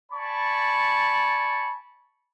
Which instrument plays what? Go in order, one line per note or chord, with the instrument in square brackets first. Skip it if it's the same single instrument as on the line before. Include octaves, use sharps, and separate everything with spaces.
[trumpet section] D5 G#5 A5 B5 C#6